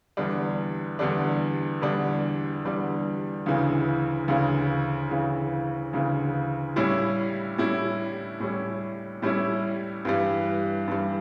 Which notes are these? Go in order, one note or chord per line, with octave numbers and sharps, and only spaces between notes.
E2 D3 G3 D4
E2 D3 G3 D4
E2 D3 G3 D4
E2 D3 G3 D4
D2 C#3 E3
D2 C#3 E3
D2 C#3 E3
D2 C#3 E3
A2 G3 C#4 E4
A2 G3 C#4 E4
A2 G3 C#4 E4
A2 G3 C#4 E4
G2 E3 G3
G2 E3 G3